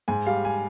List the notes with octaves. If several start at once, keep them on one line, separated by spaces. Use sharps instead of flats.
G#2 G#5
G3 F5
G#5